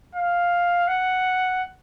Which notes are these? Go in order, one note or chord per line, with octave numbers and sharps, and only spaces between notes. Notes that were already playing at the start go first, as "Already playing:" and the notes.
F5
F#5